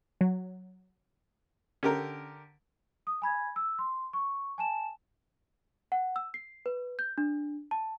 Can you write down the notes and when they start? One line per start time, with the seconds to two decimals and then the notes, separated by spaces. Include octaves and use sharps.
0.21 F#3
1.83 D3 C#4 G4 A#4
3.07 D#6
3.22 G#5 B5 G#6
3.56 E6
3.79 C6
4.13 C#6
4.58 G#5 A5 E7
5.92 F#5
6.16 E6
6.34 C7
6.66 B4
6.99 G6
7.18 D4
7.71 A5